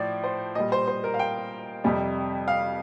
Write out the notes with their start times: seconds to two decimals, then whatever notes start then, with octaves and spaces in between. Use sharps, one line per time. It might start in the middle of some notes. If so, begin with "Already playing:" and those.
Already playing: A2 F3 D5
0.24 C5
0.55 A#2 G3 D#5
0.72 C5
0.88 C5
1.04 A#4
1.14 F5
1.19 G5
1.84 F2 C3 G3
2.48 F5